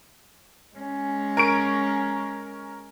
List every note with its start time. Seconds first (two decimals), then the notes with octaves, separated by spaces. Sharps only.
0.75 G#3 C#4
1.37 A#4 C#6 D7